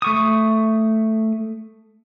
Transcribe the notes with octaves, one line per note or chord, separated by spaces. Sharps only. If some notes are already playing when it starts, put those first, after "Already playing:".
A3 C#6 D#6